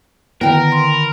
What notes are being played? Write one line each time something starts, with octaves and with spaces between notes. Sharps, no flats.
D3 D#3 B3 E4 A#4 G5
C6
B5